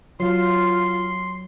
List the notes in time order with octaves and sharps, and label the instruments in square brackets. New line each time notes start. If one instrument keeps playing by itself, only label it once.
[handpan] F#3 [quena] F4 [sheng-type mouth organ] C6